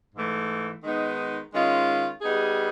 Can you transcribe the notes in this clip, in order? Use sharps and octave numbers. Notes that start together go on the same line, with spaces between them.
G#2 E3 A3
D#3 G#3 B3 D#4
D#3 G#3 C#4 F4
G3 B3 D#4 G#4